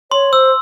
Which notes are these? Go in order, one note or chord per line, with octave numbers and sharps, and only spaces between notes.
C#5 C6
C5 E6